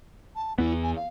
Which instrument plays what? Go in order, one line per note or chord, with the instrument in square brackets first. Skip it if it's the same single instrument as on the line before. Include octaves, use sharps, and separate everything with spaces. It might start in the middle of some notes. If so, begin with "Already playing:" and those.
[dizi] A5
[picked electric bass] E2 B3 [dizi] E4
[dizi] G#5
F5